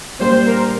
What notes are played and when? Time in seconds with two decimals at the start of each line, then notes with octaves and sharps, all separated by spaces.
0.19 A#2 G3 A#3 D4 C5
0.46 A#4